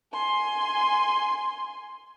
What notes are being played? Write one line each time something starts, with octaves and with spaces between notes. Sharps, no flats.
G#5 C6